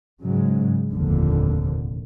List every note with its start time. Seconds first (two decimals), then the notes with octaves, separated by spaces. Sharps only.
0.22 G#2 C#3 F#3 G#3
0.91 F1 A#1 D#2 A#2 D3 F3